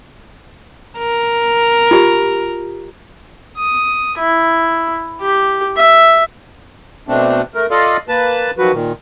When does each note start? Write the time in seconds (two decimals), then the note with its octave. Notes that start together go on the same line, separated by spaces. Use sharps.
0.98 A#4
1.91 F4 G4
3.58 D#6
4.19 E4
5.21 G4
5.77 E5
7.08 B2 A3 C4 D4
7.55 A3 A#4
7.71 F4 A4 D5 D#5 F5
8.08 A#3 B4 A5
8.58 D#3 F3 F#3 F#4 B4
8.73 A#2 D#3